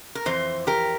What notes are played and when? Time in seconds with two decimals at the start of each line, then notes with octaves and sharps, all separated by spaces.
0.15 A#4
0.26 F2 E3 C5
0.67 G4 A#4